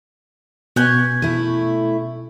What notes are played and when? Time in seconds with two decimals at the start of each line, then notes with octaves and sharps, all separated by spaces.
0.76 B2 C#4 C#5 G#5 F#6 G6
1.22 A3 E4